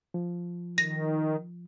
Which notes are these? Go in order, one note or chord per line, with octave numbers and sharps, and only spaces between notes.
F3
D#3 A#6